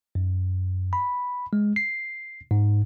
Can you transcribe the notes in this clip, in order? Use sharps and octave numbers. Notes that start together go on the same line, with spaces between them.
F#2
B5
G#3
C7
G#2